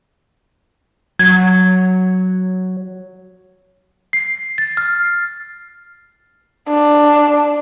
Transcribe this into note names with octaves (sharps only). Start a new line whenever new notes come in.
F#3 G#6
C7
A6
F6
D4